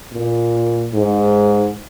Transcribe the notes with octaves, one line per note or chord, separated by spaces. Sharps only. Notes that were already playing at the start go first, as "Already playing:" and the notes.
A#2
G#2